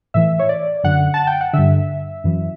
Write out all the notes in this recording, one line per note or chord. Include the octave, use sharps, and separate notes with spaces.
A2 E3 E5
C#5
D5
F#2 D3 F#5
A5
G5
F#5
G2 D3 E5
F#2 E3